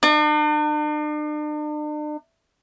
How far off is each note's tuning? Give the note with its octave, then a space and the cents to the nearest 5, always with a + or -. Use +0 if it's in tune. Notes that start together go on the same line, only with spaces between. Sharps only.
D4 +45